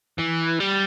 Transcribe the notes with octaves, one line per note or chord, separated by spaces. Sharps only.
E3
G3